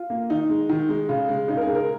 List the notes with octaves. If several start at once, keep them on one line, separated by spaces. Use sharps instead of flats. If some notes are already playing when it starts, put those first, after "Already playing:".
Already playing: F4
A#3
D#3 D#4
G#3
D#3
G#3
C#3
G#3
C#3 D#4
A#4
G#4
G#3
A#4